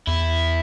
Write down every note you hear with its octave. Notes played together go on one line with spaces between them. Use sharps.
E2 E4